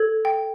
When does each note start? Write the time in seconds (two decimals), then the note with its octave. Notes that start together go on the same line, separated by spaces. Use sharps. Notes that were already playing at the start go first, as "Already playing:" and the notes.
Already playing: A4 G#6
0.25 G5